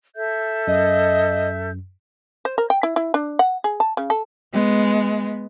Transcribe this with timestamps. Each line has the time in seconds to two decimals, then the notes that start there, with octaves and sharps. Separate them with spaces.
0.15 A4 E5 G6
0.67 F#2 D#5
2.45 C5
2.58 A#4
2.70 G5
2.83 E4
2.96 E4
3.14 D4
3.39 F#5
3.64 G#4
3.80 A5
3.97 C#3
4.10 A4
4.53 G#3 B3